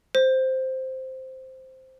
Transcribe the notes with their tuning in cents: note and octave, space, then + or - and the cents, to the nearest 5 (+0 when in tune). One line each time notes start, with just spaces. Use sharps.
C5 +0